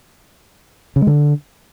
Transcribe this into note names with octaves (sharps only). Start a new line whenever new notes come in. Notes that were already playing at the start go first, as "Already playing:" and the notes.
C#3
G#3
D3